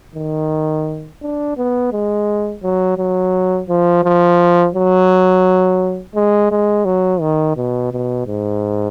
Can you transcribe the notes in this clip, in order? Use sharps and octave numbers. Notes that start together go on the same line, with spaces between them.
D#3
D4
B3
G#3
F#3
F#3
F3
F3
F#3
G#3
G#3
F#3
D#3
B2
B2
G#2